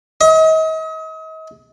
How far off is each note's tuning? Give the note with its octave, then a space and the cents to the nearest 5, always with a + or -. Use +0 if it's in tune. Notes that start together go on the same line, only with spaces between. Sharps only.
D#5 +40